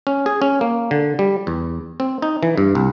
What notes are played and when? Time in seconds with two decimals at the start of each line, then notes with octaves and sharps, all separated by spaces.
0.07 C#4
0.26 G#4
0.42 C#4
0.61 A#3
0.91 D3
1.19 G3
1.47 E2
2.00 C4
2.22 D#4
2.43 E3
2.57 G2
2.75 C2